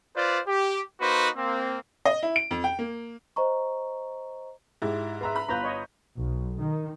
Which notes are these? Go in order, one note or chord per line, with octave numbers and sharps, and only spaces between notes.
F4 B4 C5 D5
G4
A#3 D#4 F#4 B4 C5
A#3 C4
D#5
E4
D7
F2
G5
A#3
C5 D#5 A#5 C#6
G#2 E4 G4
B4 E5 A#5 C6
B5
G1 F4 B4 A#5 G6
C#5 D#5
B1
D#3